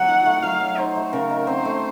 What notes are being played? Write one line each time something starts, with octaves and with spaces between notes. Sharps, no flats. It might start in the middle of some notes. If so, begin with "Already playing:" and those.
Already playing: F#3 F#5
D#4
A3
F#3 F5
F#3
D#4 C5
A3
C#3 A#4
D#4
C4 C5
A3